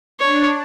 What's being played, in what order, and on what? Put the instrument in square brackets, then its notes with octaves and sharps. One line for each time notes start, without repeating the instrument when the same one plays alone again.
[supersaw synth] D4 [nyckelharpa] C#5